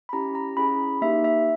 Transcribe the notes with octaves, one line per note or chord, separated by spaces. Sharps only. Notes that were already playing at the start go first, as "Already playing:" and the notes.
B5
C#4 E4 G4 A#5
A#5
C#4 E4 G#4 B5
A#3 D#4 G4 E5
E5